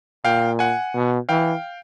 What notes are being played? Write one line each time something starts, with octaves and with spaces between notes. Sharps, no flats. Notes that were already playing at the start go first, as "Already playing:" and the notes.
A#2 F5 G5
F#5 G#5
B2
E3 F5 G5